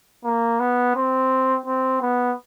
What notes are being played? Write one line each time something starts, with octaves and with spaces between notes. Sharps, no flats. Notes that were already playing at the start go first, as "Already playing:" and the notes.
A#3
B3
C4
C4
B3